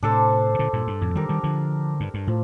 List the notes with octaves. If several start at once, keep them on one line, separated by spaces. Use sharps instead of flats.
A2 C3 D4 A4 C5
C3
A#2 D3
G2 A#2
G2
F2 A2
D#3 G3 D4 G4 A#4
D#3 G3
D3 F3
G2
G2
A2 F3